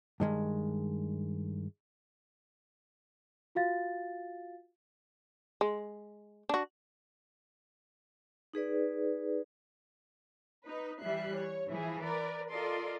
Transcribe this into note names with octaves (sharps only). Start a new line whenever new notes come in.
G2 D#3 G#3
F4 F#4 F5 A6
G#3
D4 F#4
D#4 G#4 B4 D5
D#4 B4
E3 G3 E5 F#6 C7
C#5
E3 F3 E4 G#4
A#4 B4 D5
F4 A4 A#4 D5 D#5 C6